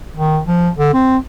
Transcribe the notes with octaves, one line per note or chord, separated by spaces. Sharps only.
D#3
F3
D3
C4